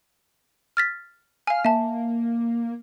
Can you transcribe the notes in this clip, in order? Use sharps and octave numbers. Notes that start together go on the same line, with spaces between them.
F6 A6 B6
F5 G#5 F6
A#3 E5 A5